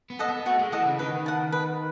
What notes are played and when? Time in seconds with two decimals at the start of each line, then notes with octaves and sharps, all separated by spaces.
0.10 B3
0.19 A4 D#5 F#5
0.29 B3
0.46 A3 F#4
0.59 G#3
0.72 E3 A4 D#5 F#5
0.86 C#3
0.99 D#3 B4
1.26 F#5 A5
1.52 B4